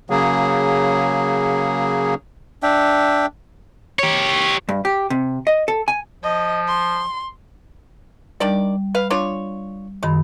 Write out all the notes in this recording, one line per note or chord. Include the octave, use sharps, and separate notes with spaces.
C#3 F#3 A#3 G#4
D4 E5 G5
G4 C#5
G2
G4
C3
D#5
A4
G#5
F3 D#5
C6
D#3 G3 D4 D5
B4 F5
D4 F4 C#5
F#2 D#3 G#3 B5